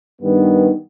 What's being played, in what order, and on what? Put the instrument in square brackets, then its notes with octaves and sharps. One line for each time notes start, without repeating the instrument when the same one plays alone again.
[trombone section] G2 D#3 G3 B3